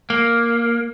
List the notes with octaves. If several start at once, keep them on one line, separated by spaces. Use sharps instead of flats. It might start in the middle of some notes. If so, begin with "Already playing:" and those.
A#3